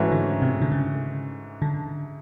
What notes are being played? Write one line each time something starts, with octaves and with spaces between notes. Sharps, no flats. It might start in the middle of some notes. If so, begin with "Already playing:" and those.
Already playing: G#2 E3 A3 C#4 F#4
D3
C3
D3
C#3
D3